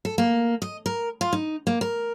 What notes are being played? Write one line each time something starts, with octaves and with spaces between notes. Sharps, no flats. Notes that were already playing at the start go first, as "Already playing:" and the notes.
A4
A#3
D#5
A#4
F4
D#4
A#3
A#4